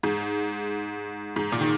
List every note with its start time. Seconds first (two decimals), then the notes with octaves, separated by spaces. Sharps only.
0.03 G#2
1.36 G#2
1.52 A#2
1.61 D#3